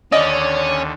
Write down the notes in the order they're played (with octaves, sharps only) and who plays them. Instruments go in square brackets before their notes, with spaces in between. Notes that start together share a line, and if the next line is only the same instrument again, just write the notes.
[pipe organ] D#2 D3 [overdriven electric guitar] C#4 [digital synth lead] D5 [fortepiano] D#5